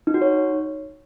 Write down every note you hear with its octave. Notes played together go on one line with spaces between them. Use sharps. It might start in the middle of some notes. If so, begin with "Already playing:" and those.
D#4
F#4
C#5